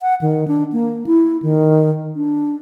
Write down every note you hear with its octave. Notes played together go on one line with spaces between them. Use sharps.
F#5
D#3
D4
A#3
E4
D#3
D4